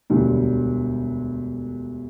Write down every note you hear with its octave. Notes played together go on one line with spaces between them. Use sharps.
E1 D2 D3 G3